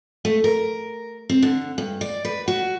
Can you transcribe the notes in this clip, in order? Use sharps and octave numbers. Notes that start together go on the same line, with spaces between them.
A3
A#4
C4
D3
G2
D5
B4
F#4